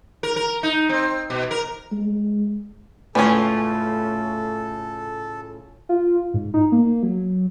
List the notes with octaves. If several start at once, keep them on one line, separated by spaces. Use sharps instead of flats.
A#4
A#4
D#4
C4
B2
A#4
G#3
A2 C#3 E3 C#4 F4 A4 C#5
F4
G#2
D#4
A#3
F#3